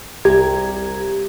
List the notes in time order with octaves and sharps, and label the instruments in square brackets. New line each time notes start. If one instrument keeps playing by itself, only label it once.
[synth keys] C2 G4 A#5 G#6